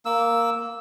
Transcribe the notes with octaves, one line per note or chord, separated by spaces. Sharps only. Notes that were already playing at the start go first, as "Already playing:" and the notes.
A#3 E6